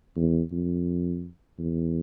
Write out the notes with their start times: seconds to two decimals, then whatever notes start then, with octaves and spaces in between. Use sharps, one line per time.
0.16 E2
0.52 F2
1.59 E2